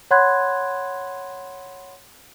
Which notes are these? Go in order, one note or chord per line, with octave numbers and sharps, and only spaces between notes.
C#5 F#5 B5 C6 F#6 G#6